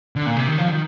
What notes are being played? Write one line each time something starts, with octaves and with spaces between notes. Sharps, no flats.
D3
A#2
C3
D#3
F3
D#3